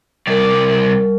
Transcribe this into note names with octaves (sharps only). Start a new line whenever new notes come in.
C2 G3 A#4 D5